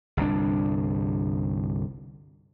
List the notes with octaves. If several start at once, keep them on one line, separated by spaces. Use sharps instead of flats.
G1 C2 D3 D4